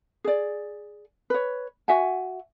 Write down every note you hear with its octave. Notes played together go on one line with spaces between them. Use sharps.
G#4 D5
B4 C#5
F#4 E5 F#5 G#5